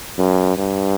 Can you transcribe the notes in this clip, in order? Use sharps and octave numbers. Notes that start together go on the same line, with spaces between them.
F#2
G2